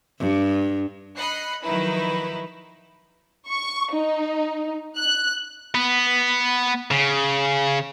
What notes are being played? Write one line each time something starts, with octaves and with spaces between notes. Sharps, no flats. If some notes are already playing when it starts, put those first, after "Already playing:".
G2
D#5 B5 F#6 C7 C#7
D#3 F3 F#3 D#4 E4 B4
C#6
D#4
F#6
B3
C#3